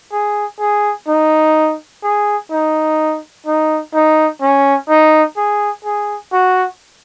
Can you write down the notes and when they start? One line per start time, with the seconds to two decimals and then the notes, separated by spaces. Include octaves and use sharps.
0.12 G#4
0.60 G#4
1.08 D#4
2.04 G#4
2.51 D#4
3.46 D#4
3.94 D#4
4.42 C#4
4.89 D#4
5.37 G#4
5.85 G#4
6.33 F#4